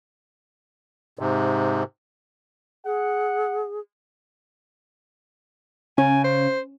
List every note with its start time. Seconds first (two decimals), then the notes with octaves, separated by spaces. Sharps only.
1.19 G#2 C3
2.85 G#4 F#5
5.98 C#3 C#4 G#5
6.24 C5